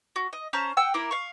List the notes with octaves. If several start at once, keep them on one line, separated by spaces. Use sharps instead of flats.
F#4
D#5
C#4 C5 A5 A#5
F#5 G5 E6
A#3 E4 A#4
F5 C#6